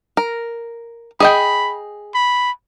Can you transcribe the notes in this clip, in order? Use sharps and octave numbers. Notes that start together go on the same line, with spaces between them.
A#4
G#4 D#5 G5 B5
B5